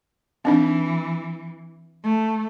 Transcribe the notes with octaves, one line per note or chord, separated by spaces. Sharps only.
E3 C4 D4 D#4
A3